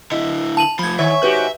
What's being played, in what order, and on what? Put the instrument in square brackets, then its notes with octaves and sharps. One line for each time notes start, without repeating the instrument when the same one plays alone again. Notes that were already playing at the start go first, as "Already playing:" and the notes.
[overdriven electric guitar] D3 E4 [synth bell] D#5
[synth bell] A5 D#7 F#7
[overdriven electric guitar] F3 A3 [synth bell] B5 G#6
[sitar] D#3 C#5 [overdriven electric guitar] E5
[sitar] G#2 F#4 G4 [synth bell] B4